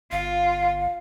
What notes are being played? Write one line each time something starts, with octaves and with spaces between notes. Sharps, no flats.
G1 F4 F5